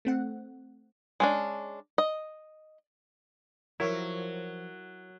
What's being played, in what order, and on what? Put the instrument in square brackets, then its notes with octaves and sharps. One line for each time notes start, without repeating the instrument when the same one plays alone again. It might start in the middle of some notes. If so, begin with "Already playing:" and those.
[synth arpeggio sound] A3 C4 F#5
[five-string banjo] G#3 C#4 D4
D#5
[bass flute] F3 [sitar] F#3 [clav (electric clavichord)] E4 [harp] A#4 C#5